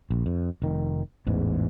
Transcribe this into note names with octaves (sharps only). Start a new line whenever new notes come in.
A#1
F2
F1 D#3
A1 E2 G#2